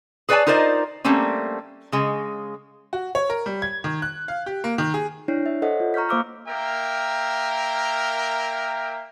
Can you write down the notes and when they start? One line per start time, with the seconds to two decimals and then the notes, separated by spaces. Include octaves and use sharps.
0.29 G#4 B4 C#5 D5 G#5 A5
0.47 D#4 F4 A#4 C5 D5 D#5
1.04 G3 A3 A#3 C4 C#4
1.92 C#3 G#3
2.93 F#4
3.15 C#5
3.30 A#4
3.46 G3
3.62 G#6
3.84 D#3
4.02 F#6
4.28 F5
4.46 G4
4.64 A#3
4.78 D#3
4.94 G#4
5.28 D4 E4 C#5 C7
5.46 E5
5.62 A4 C5 C#5 D#5 E5 F#5
5.80 F4
5.94 A#5 C#6 F6 G6 B6
6.09 A#3 C5 F5 D6 E6 F6
6.48 A#3 A#4 E5 G5